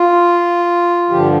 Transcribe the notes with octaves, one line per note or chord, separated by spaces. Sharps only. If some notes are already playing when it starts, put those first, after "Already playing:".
Already playing: F4
G2 D3 F3 G4